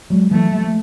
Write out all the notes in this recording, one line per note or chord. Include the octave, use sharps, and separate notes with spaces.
F#3 G#3
E3 F#3 A3
F3 G3
A3